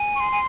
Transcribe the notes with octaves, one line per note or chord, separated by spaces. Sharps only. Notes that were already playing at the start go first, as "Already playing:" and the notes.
Already playing: G#5
C#6
C6
G#5